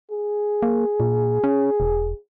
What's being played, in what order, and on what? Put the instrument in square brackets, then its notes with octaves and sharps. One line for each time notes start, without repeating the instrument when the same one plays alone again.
[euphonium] G#4
[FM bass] A#3
A#2
C#4
E1